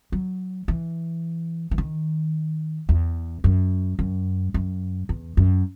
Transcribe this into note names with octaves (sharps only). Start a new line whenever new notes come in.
F#3
E3
E3
D#3
E2
F#2
F#2
F#2
E2
F#2